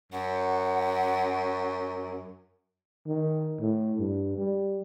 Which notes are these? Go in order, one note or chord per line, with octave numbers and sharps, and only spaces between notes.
F#2 F#5
D#3
A2
G2
G3